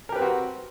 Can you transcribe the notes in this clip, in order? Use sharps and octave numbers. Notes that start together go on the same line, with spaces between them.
C4 F#4 G4 A#4 B4